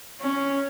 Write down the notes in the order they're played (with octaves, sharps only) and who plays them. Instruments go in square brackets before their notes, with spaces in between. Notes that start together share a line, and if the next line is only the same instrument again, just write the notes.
[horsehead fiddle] C#4